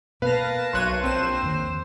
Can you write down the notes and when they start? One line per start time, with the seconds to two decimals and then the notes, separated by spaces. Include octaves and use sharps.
0.22 B2 A#3 B3 A#4 B4 F5 A5 A#6
0.73 B1 C#5 C6 F#6 D#7
1.04 A#1 C4 C5 E7
1.42 E2 D#3